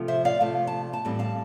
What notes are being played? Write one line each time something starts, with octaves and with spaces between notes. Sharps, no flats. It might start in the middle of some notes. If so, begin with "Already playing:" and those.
Already playing: C3 F3 A3
C5 E5
D5 F5
C3 F3 A3 A5
A5
A5
A2 E3 G3 C4
F5 A5